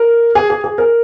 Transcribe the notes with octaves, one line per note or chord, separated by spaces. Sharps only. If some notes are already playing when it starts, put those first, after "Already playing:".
Already playing: A#4
G#4
G#4
G#4
A#4